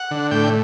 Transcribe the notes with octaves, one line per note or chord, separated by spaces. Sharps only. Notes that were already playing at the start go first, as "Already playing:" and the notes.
Already playing: F#5
D3
A2 G5